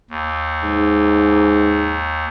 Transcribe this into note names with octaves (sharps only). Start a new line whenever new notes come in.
D#2
G#2